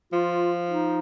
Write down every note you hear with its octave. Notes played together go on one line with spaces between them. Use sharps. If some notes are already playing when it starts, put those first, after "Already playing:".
F3 F4
D#4